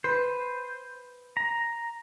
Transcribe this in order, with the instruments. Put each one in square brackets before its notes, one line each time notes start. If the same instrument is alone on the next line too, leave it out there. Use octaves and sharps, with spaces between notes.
[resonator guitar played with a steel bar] B4 [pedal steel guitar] C5
[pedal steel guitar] A#5